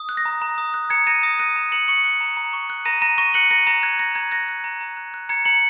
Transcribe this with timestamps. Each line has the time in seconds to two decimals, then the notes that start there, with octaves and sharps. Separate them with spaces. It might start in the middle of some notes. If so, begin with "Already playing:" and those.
Already playing: D#6
0.09 F#6
0.17 A#6
0.25 A#5
0.42 A#5
0.58 D#6
0.74 F#6
0.90 A#5 G#6 C#7
1.07 A#5 A#6 D#7
1.23 D#6 A#6
1.39 F#6 A#6 D#7
1.56 A#5
1.72 A#5 C#7 F#7
1.88 C#6 C#7 F#7
2.04 F#6
2.21 A#5
2.37 A#5
2.53 C#6
2.70 F#6
2.85 A#5 A#6 D#7
3.02 A#5 A#6 D#7
3.18 C#6 A#6 D#7
3.34 F#6 C#7 F#7
3.50 A#5 A#6 D#7
3.67 A#5 A#6
3.83 F#6 G#6
3.99 A#5 A#6
4.15 A#5 G#6
4.31 F#6 A#6
4.49 F#6
4.64 A#5
4.81 A#5
4.97 F#6
5.14 F#6
5.29 A#5 G#6 C#7
5.45 A#5 C#7 F#7